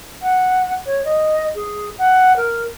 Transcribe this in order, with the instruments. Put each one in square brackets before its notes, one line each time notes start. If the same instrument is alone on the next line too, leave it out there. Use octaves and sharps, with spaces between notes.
[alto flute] F#5
C#5
D#5
G#4
F#5
A#4